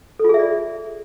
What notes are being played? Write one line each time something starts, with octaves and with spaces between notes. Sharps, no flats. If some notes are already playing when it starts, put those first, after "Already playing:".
F4 G#4 A4 D5 E5